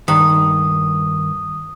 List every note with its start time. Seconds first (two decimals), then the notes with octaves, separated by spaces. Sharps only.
0.08 G2 D#3 D#6